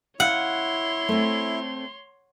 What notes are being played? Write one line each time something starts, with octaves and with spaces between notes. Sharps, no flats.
E4 C#5 F5 F#5 C6
A3 C4